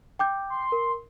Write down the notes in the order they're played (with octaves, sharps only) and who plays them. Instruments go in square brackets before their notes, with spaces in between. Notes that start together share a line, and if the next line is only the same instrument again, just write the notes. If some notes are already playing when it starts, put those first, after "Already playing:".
[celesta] G5 D6 G6
[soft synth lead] C6
[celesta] A#4